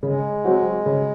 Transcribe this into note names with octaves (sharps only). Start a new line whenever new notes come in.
C#3 G#3
F#3 C4 F#4
C#3